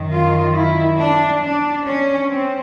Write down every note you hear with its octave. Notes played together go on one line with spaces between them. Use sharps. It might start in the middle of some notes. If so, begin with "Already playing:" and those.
Already playing: F#2 D#3
F4
E4
D4
D4
C#4
C4